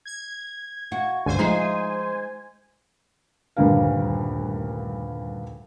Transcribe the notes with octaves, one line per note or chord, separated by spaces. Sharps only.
G#6
F#4
G1 C#2 D3 C5 G#5
F3 G#3 D#4
D#1 D2 G2 D3 A#4 F5